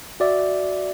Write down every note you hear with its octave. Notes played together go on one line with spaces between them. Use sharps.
F#4 D5 E5